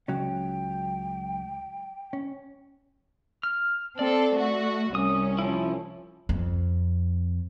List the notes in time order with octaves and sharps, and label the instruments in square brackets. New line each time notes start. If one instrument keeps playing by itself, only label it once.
[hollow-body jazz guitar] C#2 F#3 C#4 [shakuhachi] G5
[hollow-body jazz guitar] C#4
[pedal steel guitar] F6
[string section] C4 A4 [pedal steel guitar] D5
[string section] A3 F#4
[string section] C2 C#4 [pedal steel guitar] D#6
[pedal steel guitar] F3 E4
[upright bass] F2